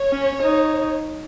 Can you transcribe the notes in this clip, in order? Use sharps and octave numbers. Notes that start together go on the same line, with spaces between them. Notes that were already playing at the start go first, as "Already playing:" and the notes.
Already playing: C#5
C#4
D#4